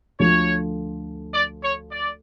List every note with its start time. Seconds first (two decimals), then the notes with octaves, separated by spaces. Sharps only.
0.19 D2 D3 F3 C#5
1.34 D5
1.63 C#5
1.91 D5